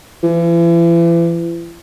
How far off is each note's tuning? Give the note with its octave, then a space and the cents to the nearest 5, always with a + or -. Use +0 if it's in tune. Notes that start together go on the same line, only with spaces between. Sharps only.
E3 +40